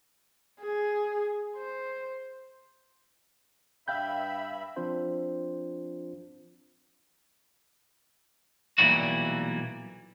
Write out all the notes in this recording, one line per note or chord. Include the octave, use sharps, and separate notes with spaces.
G#4
C5
G2 E5 F5 G5 B5 G6
F3 C4 D4 F4 C5
B1 A#2 E3 G3 F#4